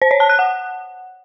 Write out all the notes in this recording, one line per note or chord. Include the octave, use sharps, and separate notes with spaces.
C5
C#5
A5
F#6
F#5